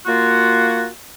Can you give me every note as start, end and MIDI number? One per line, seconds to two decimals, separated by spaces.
0.06 0.87 58
0.06 0.87 65
0.06 0.87 66